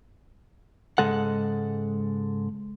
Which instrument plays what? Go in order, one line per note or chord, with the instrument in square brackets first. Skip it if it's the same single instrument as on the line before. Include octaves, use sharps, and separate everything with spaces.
[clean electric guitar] G#2 C#3 G#3 A4 F#5